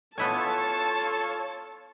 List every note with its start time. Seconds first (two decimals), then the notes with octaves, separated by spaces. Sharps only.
0.18 B3 E4 F4 A4 C#5 G#5 A5